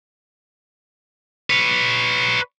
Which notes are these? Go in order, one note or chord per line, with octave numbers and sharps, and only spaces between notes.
B4 C#5